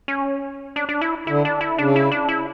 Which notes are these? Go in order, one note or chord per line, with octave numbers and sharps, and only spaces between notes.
C#4
D4
D4
E4
D3 E4
D4
E4
C#3 D4
E4
D4
E4